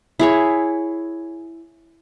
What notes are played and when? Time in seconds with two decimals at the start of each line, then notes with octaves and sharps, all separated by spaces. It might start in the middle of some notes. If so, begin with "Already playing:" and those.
0.19 E4 G#4 C#5